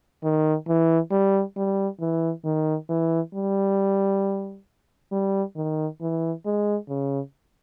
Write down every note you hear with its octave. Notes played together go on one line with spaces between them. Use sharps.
D#3
E3
G3
G3
E3
D#3
E3
G3
G3
D#3
E3
G#3
C#3